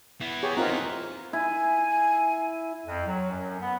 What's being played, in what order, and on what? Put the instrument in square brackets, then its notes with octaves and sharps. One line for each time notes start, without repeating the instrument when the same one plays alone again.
[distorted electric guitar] E3 B3
[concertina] G4 C#5 [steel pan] G#4
[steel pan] C4 F4 A#4 [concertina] D#4 A#5 F#6
[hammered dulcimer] E4 [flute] G#5
[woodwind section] F2
F#3
F#2
B3